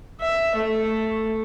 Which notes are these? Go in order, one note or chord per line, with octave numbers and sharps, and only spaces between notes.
E5
A3